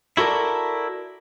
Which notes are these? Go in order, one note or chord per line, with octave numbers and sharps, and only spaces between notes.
E4 F#4 A4 A#4 D5